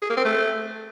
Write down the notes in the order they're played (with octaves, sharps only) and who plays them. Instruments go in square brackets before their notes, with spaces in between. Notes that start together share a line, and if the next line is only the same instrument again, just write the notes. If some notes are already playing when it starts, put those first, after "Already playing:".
[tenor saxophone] G#4
A#3
C4
A3